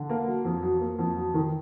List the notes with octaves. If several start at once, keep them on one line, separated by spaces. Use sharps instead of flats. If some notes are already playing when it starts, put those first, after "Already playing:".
Already playing: D3
A#3
F#3
F2
F#3
A#3
F2
F#3
D#3